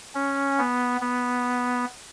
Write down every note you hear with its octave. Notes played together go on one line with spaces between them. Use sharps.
C#4
B3
B3